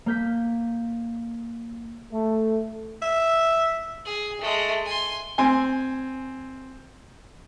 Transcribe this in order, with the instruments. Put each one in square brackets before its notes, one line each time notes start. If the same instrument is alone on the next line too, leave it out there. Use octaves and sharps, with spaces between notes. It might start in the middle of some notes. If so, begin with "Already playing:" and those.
[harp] A#3 G6 B6
[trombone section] A3
[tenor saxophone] E5
[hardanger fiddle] G#4
G#3 A3
G#5 C6
[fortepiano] C4 G#5